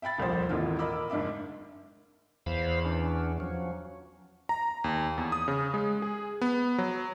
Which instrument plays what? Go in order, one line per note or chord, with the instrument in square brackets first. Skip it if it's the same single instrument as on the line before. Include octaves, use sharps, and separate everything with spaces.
[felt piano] E5 G5 B5 A6
D#1 C2 F2 C5
D#1 G#1 D#2 E3 F4
A#4 D#5 B5 D6 E6
F#1 G#2 D4 E5 D6
[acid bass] E2 [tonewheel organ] C5 F5 B5
[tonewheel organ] E3 C#4 D4
F3 F#3 C#4
[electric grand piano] A#5
D#2
E2
D#6
C#3
G#3
G#4
B3
F#3